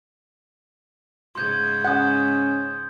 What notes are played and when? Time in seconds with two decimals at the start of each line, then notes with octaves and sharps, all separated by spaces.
1.35 G#2 C#3 C6 G6 G#6
1.85 C#4 F#5 D#6 G6